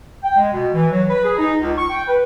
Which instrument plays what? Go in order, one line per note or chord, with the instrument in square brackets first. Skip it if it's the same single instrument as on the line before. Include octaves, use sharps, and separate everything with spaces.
[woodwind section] G5
G#3
B2
E3
F#3
B4
G#4
D#4
C#2
C#6
G5
B4